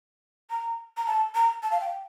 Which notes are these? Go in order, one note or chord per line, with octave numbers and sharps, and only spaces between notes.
A#5
A#5
A5
A#5
A5
F5
G5